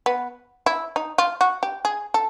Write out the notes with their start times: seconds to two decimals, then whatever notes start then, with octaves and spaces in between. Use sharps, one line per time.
0.06 B3
0.66 E4
0.96 D#4
1.18 F4
1.41 F#4
1.63 G4
1.85 G#4
2.14 A4